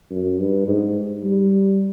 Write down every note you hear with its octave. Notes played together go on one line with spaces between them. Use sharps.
F#2
G2
G#2
G3